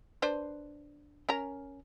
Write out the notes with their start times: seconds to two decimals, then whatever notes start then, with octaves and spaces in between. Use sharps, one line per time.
0.22 D4 B4 C5
1.29 C#4 A#4 A#5